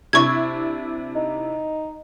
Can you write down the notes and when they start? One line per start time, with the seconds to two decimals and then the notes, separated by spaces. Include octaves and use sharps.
0.13 C3 D4 E4 C#6 G#6
1.16 D#4